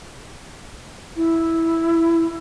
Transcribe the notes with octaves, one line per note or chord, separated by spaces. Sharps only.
E4